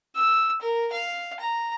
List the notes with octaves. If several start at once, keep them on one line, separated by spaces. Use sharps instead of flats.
E6
A#4
F5
A#5